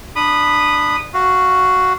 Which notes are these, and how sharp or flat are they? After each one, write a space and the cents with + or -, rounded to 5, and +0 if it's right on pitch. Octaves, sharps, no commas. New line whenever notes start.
D4 +15 B5 +0 D#6 -15
F#4 +0 F5 -20